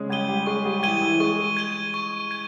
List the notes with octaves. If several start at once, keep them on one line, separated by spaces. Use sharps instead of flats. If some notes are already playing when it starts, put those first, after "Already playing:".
Already playing: C#3 G#3 C#4 G#4
G3 G4 G#6 D#7 G7
G3 G4
G#3 G#4 C#6
G3 G4
G4
E3 E4 G#6 D#7 G7
E3 E4
G#3 G#4 C#6
G#6 D#7 G7
C#6
G#6 D#7